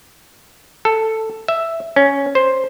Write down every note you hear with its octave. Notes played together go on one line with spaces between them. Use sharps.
A4
E5
C#4
C5